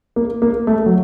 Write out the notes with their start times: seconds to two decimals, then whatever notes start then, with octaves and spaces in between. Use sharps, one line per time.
0.16 A#3
0.42 A#3
0.67 A3
0.86 F#3